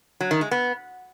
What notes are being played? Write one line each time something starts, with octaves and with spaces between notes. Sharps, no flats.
F#3
D#3
G#3
B3